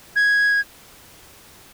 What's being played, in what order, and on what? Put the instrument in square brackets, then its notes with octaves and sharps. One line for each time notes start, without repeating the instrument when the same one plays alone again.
[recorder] G#6